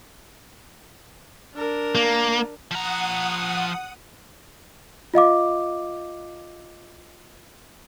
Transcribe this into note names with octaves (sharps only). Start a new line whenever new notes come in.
D4 A#4
A#3
F3 F#5 A#5 D#6
F4 D#5 F5 D6